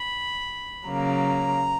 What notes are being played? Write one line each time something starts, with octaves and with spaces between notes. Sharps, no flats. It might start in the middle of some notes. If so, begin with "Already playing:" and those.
Already playing: B5
C#3 F#3 A#3 A#5